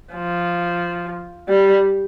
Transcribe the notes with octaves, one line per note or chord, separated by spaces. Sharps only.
F3
G3